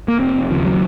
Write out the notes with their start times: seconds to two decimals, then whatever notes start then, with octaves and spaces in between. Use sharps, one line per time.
0.08 A#3
0.20 F1 C4
0.50 D#2 C#3 F3
0.65 F#3